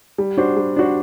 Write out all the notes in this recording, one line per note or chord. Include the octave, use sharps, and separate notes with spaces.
G3
D4 F#4 C5
G3
D4 F#4 C5